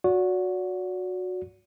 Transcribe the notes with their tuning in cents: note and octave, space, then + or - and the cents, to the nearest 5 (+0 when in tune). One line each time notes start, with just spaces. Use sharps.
F#4 -20 D5 -40